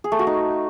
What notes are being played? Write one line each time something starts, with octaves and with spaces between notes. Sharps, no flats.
G#4
A3
F#4
D#4